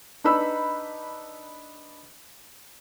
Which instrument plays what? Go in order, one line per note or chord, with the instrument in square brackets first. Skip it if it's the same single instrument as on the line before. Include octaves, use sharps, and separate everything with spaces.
[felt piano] D4 D#4 B4 B5 E6